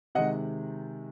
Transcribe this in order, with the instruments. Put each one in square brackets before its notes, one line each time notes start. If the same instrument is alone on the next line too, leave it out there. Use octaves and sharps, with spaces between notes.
[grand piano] C3 D#3 G#3 D#5 F#5